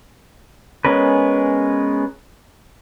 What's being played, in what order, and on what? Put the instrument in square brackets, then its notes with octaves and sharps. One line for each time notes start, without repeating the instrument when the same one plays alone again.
[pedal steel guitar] G#3 B3 C#4 A#4 B4